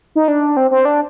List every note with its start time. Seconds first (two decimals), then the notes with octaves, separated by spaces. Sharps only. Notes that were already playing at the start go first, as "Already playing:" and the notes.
0.16 D#4
0.28 D4
0.57 C4
0.71 C4
0.85 D4